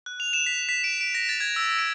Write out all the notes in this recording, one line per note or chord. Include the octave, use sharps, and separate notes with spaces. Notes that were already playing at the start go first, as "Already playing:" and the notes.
F#6
F7
E7
B6
B6
D7
D7
A#6
A6
G#6
E6
D7